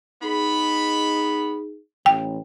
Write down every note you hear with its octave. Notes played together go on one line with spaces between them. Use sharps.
B3 D#4 G#4 B5
A1 G5